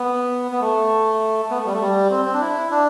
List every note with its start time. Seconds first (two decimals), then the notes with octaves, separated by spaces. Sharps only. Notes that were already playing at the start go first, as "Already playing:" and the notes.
Already playing: B3
0.51 B3
0.61 A3
1.51 B3
1.58 A3
1.66 G3
1.73 A3
1.81 G3
2.10 C4
2.25 C4
2.33 D4
2.41 E4
2.71 D4